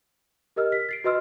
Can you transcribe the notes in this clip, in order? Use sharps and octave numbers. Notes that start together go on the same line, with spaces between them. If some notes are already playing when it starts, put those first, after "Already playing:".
G4 A#4 D#5 E6 F6
B6
A6 C7 D7
F#4 B4 D#5 C6 E6 F6